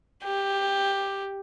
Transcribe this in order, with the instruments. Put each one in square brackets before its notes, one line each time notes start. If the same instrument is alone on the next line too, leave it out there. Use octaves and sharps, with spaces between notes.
[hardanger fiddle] G4